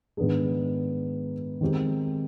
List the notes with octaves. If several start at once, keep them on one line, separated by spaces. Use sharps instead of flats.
G#2 D#3 B3 D4 G#4
D#3 G#3 C4 G4